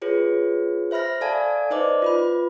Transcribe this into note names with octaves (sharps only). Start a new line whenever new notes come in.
F4 G#4 B4 C#5
C5 E5 B5 F6 A#6
A4 D5 F5 G#5 A5 G#6
D#4 B4 C5 D5 D#5 D6
F4 B4 B5